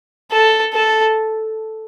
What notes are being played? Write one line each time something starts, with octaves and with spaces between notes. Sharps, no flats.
A4
A4